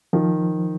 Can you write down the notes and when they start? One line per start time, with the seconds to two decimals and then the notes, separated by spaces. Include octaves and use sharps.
0.13 D#3 F3